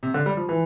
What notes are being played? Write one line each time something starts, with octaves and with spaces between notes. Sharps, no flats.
C3
D3
G3
F3
E3